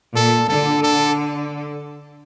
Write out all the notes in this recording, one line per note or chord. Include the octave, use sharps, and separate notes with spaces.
A#2 A4
D3 A4
A4